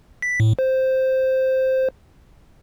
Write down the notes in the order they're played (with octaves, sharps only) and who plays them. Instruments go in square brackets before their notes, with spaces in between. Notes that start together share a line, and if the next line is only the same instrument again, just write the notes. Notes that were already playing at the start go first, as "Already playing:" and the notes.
[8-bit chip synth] B6
A2
C5